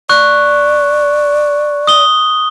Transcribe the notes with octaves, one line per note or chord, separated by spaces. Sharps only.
D5 C#6 F#6
D#6 G7